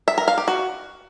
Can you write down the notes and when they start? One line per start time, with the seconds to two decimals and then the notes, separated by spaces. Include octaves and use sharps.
0.08 E5
0.18 A#4
0.28 F5
0.38 G4
0.48 F#4